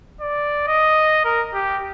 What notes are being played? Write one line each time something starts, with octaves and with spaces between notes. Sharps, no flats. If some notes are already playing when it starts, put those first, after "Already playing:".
D5
D#5
A#4
G4